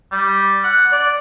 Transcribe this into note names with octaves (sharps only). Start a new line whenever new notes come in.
G3
F#5
D5